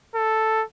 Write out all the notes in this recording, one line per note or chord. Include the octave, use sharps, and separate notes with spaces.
A4